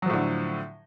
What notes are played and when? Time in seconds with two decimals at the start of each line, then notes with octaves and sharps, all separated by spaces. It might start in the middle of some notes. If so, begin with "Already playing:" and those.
0.02 F#3
0.06 F3
0.10 A2
0.13 D3